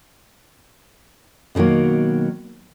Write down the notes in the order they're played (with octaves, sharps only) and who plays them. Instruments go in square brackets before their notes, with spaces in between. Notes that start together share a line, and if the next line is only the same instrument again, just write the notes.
[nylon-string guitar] B2 D3 D#3 F#3 A#3